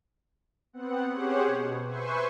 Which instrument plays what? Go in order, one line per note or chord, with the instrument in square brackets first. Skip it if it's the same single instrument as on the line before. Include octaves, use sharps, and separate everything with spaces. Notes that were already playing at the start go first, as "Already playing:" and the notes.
[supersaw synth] B3 C4 F#5
C#4 G4 G#4 C5 C#5 F#5
B2
B4 C5 E5 G#5 C6 C#6